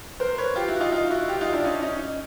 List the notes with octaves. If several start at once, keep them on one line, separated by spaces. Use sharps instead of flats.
A#4 C5
B4 C#5
F4 G4
E4 F#4
D#4 F4
D#4 F4
E4 F#4
F4 G4
D#4 F4
D4 E4
C#4 D#4
C#4 D#4